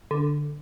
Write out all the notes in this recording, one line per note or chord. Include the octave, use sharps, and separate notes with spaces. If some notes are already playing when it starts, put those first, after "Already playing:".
D3